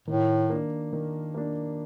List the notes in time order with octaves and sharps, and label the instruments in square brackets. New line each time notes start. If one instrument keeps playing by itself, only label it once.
[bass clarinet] A2 [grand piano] D#3
[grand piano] A#3 D4
D#3
A#3 D4